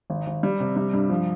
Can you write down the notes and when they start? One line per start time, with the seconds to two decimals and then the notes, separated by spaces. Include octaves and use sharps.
0.10 G#1
0.27 G#1
0.43 G3
0.60 C3
0.76 G3
0.94 G2
1.10 F3